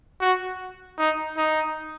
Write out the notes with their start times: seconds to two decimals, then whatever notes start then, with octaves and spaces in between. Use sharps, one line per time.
0.20 F#4
0.99 D#4
1.37 D#4